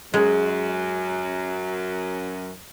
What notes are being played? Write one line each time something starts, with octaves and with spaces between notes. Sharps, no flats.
F#2 G#3